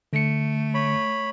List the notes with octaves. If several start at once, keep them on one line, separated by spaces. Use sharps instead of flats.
D3 A3 C#7
C#5 B5